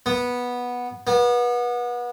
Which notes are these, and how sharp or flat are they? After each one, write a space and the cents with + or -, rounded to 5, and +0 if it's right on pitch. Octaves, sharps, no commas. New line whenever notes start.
B3 -10
B3 -30